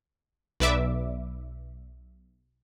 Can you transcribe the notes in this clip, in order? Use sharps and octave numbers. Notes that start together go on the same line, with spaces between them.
B1 B4 D5 E5 D6